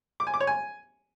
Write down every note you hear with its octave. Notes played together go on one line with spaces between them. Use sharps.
D6
G#5
D6
C#5
G#5